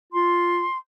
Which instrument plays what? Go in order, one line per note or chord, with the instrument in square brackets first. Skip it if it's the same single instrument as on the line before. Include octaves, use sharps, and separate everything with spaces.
[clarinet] F4 [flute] C6